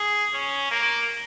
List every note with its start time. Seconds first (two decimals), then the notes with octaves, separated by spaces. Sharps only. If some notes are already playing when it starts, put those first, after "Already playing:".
Already playing: G#4
0.33 C#4
0.71 A#3